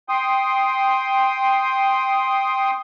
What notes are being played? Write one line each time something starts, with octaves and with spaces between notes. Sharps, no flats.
G5 C6 D#6